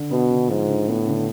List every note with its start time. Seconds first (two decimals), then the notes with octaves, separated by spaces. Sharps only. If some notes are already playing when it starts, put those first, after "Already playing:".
Already playing: D3
0.11 B2 B3
0.31 D3
0.50 G#2 F3
0.69 D3
0.88 A2 B3
1.07 D3